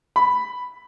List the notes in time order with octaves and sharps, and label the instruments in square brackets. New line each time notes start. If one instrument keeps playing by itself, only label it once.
[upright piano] B5